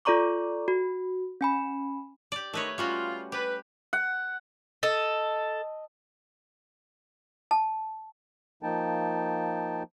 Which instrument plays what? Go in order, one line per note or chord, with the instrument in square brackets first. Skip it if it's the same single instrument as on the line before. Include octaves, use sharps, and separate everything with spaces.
[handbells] F4 A4 D5 A#5 C#6 D6
F#4
C#4 G#5 B5
[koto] G4 D5
[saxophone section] D#3 D#5 [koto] A3 B4 C#5
[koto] G3 C#4 F#4 [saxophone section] F4
[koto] G4 [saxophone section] B4
[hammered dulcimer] F#5
[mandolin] A4 [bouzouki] D#5
[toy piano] A5
[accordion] F3 A#3 D#4 G5 A5